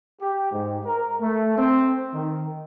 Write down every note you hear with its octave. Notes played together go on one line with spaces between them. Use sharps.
G4
G#2
A#4
A3
C4
D#3